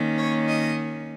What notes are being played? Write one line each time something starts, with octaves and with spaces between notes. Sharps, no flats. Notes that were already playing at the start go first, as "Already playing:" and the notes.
Already playing: D#3 A#3 C#4
C#5
D#5